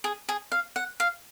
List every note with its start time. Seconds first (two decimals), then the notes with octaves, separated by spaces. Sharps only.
0.04 G#4
0.29 G#4
0.52 F5
0.76 F#5
1.00 F5